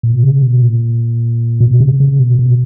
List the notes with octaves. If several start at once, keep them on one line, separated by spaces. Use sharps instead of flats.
A#2
B2
C#3
B2
A#2
B2
C#3
C#3
B2
B2